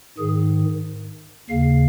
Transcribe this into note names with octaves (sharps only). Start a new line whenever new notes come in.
G#2 D#3 G#4
D#2 C#3 F5